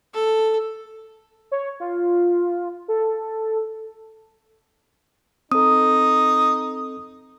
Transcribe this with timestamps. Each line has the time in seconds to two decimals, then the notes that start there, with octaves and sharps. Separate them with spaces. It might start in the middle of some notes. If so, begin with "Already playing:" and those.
0.13 A4
1.52 C#5
1.80 F4
2.88 A4
5.52 C4 D#4 A4 D#6